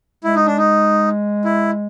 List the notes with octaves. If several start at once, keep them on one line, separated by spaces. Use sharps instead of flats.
G#3 E4
D#4
D4
D#4
E4